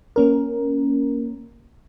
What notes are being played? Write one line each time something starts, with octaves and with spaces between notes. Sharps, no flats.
A#3 C#4 A#4